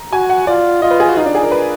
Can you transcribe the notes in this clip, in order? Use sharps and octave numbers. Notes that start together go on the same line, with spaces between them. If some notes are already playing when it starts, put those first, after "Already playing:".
Already playing: A#5
F#4 G#5
F#5
F4 D5
F4 D#5
B4
G#4
F#4
D#4 F4
D4
G#4
A#4
B4